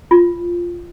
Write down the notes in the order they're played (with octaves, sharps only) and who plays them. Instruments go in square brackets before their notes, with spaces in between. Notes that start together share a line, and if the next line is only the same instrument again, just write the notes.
[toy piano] F4